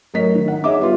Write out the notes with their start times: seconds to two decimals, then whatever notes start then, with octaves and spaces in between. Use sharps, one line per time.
0.14 A2 F#3 A#4 C#5 D#5 B6
0.35 D#3
0.48 D#4 F#5
0.64 G#4 C#5 D#5 E5 D6
0.79 G3 B3 F4